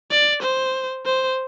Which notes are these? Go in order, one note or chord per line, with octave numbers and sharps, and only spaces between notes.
D5
C5
C5